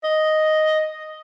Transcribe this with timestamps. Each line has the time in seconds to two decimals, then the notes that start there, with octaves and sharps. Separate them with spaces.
0.04 D#5